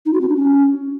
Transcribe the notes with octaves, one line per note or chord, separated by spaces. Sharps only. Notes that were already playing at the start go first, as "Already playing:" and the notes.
D#4
F#4
C4
D4
C#4